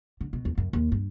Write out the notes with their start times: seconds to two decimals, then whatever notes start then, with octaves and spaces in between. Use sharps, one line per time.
0.21 D3
0.33 B2
0.45 E2
0.58 F#2
0.73 D#2
0.92 G2